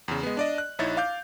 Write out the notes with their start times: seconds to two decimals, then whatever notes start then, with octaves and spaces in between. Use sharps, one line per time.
0.08 E2 C#3
0.23 G#3 B3
0.37 D4 D5 D#5
0.58 F#6
0.79 A#1 D#4 E4 C#5 A6
0.97 F5 D6 G6